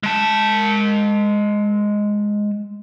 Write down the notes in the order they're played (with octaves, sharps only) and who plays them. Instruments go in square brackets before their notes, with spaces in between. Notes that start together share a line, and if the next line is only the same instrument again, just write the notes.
[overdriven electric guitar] G#3 A5